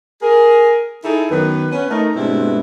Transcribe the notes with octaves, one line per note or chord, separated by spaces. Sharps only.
G#4 A#4
D#4 E4 G#4 A4
F#2 D#3 B3 B4
B3 C#4 B4
A3 D#4 A#4
G2 B2 G#3 A3 C4 E4